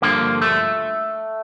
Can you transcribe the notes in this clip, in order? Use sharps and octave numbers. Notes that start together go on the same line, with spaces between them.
G2 D3 F3 A#3
A3